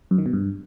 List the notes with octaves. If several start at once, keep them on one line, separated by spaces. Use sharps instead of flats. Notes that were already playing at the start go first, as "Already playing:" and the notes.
F#2
D#3
B2
G2